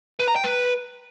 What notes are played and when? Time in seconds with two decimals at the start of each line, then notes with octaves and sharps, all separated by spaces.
0.19 B4
0.28 A#5
0.36 G5
0.44 B4